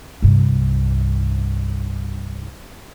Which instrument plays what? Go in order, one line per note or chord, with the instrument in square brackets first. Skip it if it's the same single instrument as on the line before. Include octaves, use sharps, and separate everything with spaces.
[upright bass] C2 G2